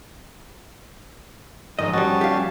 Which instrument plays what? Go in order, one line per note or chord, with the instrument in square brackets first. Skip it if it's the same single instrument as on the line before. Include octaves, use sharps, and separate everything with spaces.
[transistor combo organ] G#2 D#3 [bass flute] F3 [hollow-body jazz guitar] D#5
[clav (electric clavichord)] G3 F#4 [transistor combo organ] C#4 A5
[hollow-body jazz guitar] G4 F5